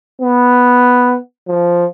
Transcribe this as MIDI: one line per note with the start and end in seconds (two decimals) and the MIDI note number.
0.21 1.18 59
1.48 1.85 53